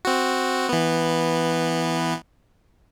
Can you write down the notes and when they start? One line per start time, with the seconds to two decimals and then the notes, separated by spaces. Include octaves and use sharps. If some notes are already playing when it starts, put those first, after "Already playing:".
0.05 C4 F#4
0.69 E3 B3